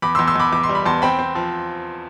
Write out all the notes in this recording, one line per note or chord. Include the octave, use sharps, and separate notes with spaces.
E2 B5 D6
C6 E6
E2
C6 E6
E2 B5 D6
E2 D6
C6
G3
B5
E2 A5 C6
C4 G5 B5
C4
F3